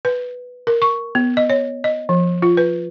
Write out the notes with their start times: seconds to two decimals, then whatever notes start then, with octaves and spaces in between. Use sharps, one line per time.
0.05 B4
0.67 A#4
0.82 C#6
1.15 B3
1.37 D#5
1.50 C#5
1.84 D#5
2.09 F3
2.42 F4
2.57 B4